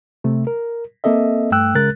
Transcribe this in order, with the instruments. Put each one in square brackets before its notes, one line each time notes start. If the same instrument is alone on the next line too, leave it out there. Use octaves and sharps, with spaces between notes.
[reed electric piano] C3 A3
A#4
A#3 C4 A4 D#5 E5
G2 A3 G5 E6 F#6
C#3 G#3 A#4 F#6 A6